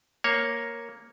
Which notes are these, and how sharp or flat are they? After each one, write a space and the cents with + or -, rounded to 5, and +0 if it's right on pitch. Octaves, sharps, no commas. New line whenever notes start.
A#3 +0 C#5 -5